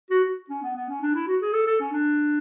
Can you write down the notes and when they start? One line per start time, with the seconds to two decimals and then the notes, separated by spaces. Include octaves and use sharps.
0.10 F#4
0.24 F#4
0.49 C#4
0.62 B3
0.75 B3
0.89 C#4
1.02 D4
1.14 E4
1.27 F#4
1.41 G#4
1.53 A4
1.67 A4
1.80 C#4
1.92 D4